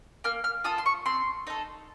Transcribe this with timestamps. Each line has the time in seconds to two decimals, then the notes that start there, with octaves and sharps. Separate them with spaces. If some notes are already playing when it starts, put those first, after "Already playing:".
0.24 A#3 F6
0.44 F6
0.64 F4 A4 D#6
0.78 C6
0.86 C#6
1.06 C4 C6
1.47 D#4 A4